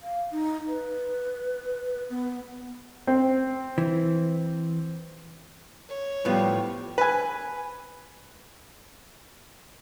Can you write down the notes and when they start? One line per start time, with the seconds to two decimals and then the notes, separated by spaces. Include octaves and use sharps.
0.02 F5
0.32 D#4
0.68 B4
2.10 B3
3.07 C4
3.78 E3
5.89 C#5
6.25 A2 F3 G3 B3
6.98 B4 G#5